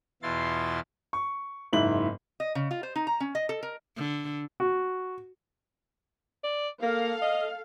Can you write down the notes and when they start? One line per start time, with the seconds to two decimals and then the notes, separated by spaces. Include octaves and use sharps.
0.22 E2 B2 E4 F4 C6 A6
1.13 C#6
1.73 F#1 G#2 E4 E5 F#7
2.40 D#5
2.55 C#3
2.71 F4
2.83 C5
2.96 D#4
3.07 A#5
3.20 C#4
3.35 D#5
3.49 A4
3.63 A#4
3.97 D3
4.60 F#4
6.44 D5
6.82 A#3 A4 F5
7.22 D#5